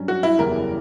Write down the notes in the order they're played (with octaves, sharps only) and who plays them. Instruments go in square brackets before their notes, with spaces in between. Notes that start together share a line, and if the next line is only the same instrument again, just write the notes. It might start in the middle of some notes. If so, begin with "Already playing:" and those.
Already playing: [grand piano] G2 F#3 C#4
[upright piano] F#4
E4
[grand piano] F#1 E2 C#3 E3 G3 [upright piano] A#4